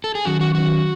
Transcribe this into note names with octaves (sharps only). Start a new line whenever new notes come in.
A4
G#4
D#3 F#3 C#4 F#4
F#4
D#3 F#3 C#4 F#4